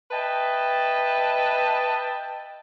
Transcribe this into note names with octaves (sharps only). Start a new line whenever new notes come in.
B4 D#5 E5 G5 A5